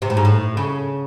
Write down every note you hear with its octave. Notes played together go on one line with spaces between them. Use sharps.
C3
A2
G#2
A2
C#3